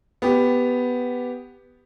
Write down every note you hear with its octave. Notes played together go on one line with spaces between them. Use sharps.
B3 G4